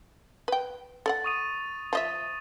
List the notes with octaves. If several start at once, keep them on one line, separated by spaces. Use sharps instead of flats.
B4 G5
A4 D5 F#5 A6
C#6 D#6 D#7
F3 D#5 E5 A6